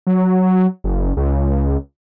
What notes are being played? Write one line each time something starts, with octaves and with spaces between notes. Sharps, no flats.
F#3
F#1
C#2